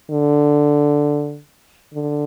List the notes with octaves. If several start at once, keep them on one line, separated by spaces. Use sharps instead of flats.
D3
D3